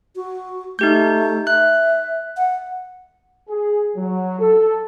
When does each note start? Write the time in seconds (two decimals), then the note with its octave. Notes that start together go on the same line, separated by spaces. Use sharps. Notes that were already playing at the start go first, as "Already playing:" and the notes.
0.16 F#4
0.79 A3 D#4 G4 G6
1.47 E5 F#6
2.37 F#5
3.48 G#4
3.96 F#3
4.39 A4